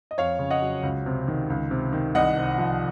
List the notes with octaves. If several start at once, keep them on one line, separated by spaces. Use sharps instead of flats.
D#5
F2 C#5 F5
C#3
D#5 F#5
F#3
C#2
C3
D#3
C#2
C3
D#3
C2 D#5 F#5
C3
F3